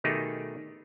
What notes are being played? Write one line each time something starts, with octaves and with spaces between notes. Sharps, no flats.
B2 D#3 A3 D#4 G4 G#4